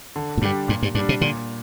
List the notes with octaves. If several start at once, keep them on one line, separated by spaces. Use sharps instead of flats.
D3
A#2
G2 G3 D4 G4
G2 A#2
G2
G2 G3 D4
C3
A#2 D3